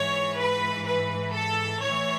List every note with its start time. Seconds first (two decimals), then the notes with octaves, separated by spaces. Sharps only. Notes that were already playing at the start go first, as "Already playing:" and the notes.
Already playing: G#2 E3 C#5
0.37 B4
0.85 B4
1.32 A4
1.80 A2 E3 C#5